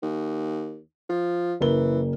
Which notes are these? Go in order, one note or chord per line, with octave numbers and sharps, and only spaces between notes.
D#2
F3
F#1 E3 A#4 G7